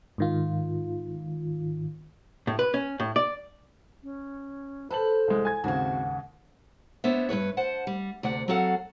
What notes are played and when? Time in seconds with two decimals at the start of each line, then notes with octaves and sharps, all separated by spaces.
0.18 G#2 D#3 F4
2.47 A2
2.59 B4
2.74 C#4
3.00 A2
3.16 D5
4.03 C#4
4.90 A4 B4 C5 A5 F#7
5.28 C2 G#3
5.45 G#5 G#6
5.64 D#2 G#2 C#3 C4 F#4 F#5
7.04 B3 D4 C5 C#5 E5
7.29 G2 C3 B4 C#5
7.57 C5 F#5 A5
7.87 G3
8.23 D2 C3 D5 F#5
8.48 F#3 C4 F#4 A4 F5 F#5